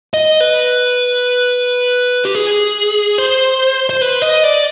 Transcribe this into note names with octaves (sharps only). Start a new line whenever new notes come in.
D#5
B4
G4
G#4
C5
C5
B4
D#5
D5